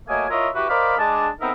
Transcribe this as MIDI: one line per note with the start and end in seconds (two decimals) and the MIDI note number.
0.08 0.26 54
0.08 0.26 57
0.08 0.26 58
0.08 0.26 75
0.08 0.26 80
0.29 0.49 64
0.29 0.49 65
0.29 0.49 70
0.29 0.49 73
0.29 0.49 75
0.29 0.49 76
0.55 0.67 64
0.55 0.67 66
0.55 0.67 67
0.55 0.67 71
0.69 0.96 70
0.69 0.96 72
0.69 0.96 74
0.69 0.96 75
0.69 0.96 77
0.69 0.96 83
0.98 1.29 56
0.98 1.29 62
0.98 1.29 81
1.41 1.52 59
1.41 1.52 60
1.41 1.52 63
1.41 1.52 69
1.41 1.52 70
1.41 1.52 76